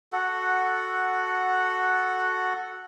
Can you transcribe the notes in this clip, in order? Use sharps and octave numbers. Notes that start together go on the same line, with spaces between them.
F#4 A4 F#5